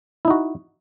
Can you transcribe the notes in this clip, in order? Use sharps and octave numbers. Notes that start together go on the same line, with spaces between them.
D#4 E4 F#4